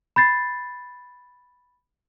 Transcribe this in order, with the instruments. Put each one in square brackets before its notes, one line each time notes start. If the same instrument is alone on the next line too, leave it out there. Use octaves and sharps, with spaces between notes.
[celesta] B5 G6 A6 C7